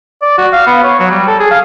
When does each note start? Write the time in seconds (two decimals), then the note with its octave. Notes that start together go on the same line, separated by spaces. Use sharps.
0.22 D5
0.38 F#4
0.53 F5
0.67 B3
0.84 C#5
0.99 F#3
1.11 G3
1.27 A4
1.39 G#4
1.51 F5